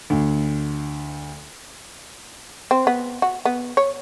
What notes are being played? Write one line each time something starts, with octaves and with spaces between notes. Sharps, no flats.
D2
C4
B3
F#4
B3
C#5